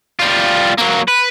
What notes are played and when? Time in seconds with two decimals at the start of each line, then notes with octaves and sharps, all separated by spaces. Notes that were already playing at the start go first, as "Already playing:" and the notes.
0.20 G3 F4
0.78 F#3 A#3
1.08 B4